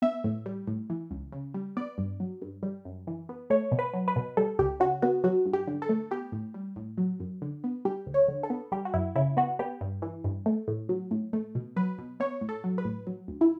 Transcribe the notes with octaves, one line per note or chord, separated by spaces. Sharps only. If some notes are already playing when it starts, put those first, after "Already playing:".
B3 E5
A2
G3
A2
E3
C#2
C#3
G3
B3 D5
G2
F#3
G2
G3
F#2
E3
B3
A3 C#5
B2
B4
F#3
B4
B2
G3 A4
C#2 G4
C#3 F#4
B3 F#4
F#3 F#4
G2
G4
D3
A4
A3
B3 G4
A2
G3
A2
F#3
F#2
D3
B3
G3 G4
D2
C#5
D3
A4
B3
G3 G4
F#4
F#2 E4
C#3 E4
B3 F#4
B3 G4
G2
E3
G2
A3
A2
F#3
A2
A3
B2
F#3 B4
B2
B3 C#5
A2
A4
F#3
B4
A2
F#3
D2
E4